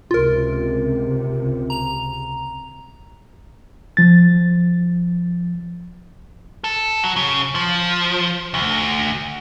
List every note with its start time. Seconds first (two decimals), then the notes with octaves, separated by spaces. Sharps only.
0.11 C#2 C3 F4 A#4
1.70 A#5 F7
3.97 F3 A6
6.64 A4
7.04 F#3
7.16 C#3
7.55 F3
8.54 D2